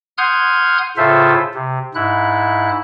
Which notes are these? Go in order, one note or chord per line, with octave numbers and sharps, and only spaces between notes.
F#5 C6 D#6 F6 G6 G#6
A2 C#3 F4 A4 C5 E5
C3
G#2 E4 F#6